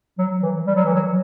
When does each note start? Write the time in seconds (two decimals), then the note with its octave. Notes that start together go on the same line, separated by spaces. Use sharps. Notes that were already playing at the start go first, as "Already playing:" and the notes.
0.18 F#3
0.43 E3
0.67 G3
0.75 F#3
0.85 E3
0.94 F#3